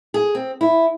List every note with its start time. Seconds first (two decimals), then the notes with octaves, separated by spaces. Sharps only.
0.14 G#4
0.35 C4
0.61 E4